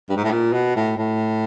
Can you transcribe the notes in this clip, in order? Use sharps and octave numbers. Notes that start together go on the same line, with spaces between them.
G2
G#2
A2
A#2
B2
A2
A2